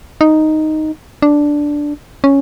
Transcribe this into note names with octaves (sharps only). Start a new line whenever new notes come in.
D#4
D4
C#4